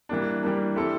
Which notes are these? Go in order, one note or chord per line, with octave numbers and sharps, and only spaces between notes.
E3 G3 A#3 D4
E3 G3 A#3 D4
G3 C4 E4 A4